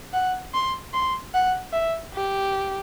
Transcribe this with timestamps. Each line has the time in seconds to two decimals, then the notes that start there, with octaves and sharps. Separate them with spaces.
0.13 F#5
0.54 C6
0.93 C6
1.34 F#5
1.73 E5
2.14 G4